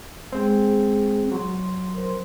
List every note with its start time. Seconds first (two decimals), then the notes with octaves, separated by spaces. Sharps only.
0.32 G#3 C4 G#4
1.32 F#3 C6
1.94 A#4 C5 C6